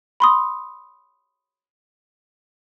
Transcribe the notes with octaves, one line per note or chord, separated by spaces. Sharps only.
B5 C6 D#6